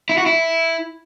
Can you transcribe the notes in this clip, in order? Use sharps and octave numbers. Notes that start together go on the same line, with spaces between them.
E4
F#4
E4